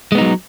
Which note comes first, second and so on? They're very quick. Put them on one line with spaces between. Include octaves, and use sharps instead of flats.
G#3 B3 D#4 F#3